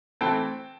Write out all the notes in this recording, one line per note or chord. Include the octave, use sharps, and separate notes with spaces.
E3 A3 C4 G5 A5